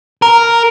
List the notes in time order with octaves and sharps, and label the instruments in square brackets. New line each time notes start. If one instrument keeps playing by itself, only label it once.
[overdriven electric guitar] A#4